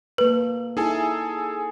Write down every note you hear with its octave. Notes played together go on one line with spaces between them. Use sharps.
A#3 A4 B4
D#4 E4 G#4 A4 G#5